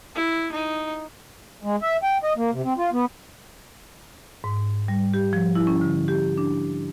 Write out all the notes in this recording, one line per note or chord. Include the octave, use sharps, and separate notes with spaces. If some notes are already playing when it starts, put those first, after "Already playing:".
E4
D#4
G#3
E5
G5
D#5
A#3
C3
C4
F4
B3
G#2
G3
G4
F3
E4
C#4
D3
G4
D4